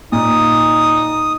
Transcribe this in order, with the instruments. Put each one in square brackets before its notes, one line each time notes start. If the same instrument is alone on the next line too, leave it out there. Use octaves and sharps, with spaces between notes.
[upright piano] A#2 [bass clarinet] D#4 [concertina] D#6